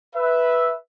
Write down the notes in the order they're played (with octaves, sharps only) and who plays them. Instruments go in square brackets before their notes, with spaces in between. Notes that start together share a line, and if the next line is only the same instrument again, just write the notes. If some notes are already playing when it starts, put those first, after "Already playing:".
[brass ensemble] B4 E5